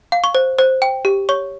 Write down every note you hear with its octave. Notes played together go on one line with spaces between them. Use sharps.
F5
C#6
C5
C5
G5
G4
C#5 C#6